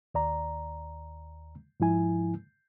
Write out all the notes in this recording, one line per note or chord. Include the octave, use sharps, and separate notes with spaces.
D#2 D5 A#5
G#2 F3 E4 G#5